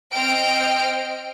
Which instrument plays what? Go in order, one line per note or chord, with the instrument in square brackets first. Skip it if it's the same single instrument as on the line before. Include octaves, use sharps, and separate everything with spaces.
[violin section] C4 D#5 G5 F6 D7